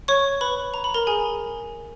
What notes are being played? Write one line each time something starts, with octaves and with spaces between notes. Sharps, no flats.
C#5 C#6
B4 B5
A#5
B5
A#4 A#5
G#4 G#5